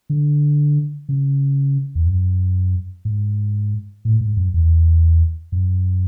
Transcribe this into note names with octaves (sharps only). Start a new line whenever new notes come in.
D3
C#3
E2
F#2
G#2
A2
G#2
F#2
E2
F#2